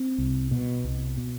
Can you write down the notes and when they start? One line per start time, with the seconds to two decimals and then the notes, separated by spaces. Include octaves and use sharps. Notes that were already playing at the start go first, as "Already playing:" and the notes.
Already playing: C4
0.18 C2
0.51 B2
0.84 C2
1.17 B2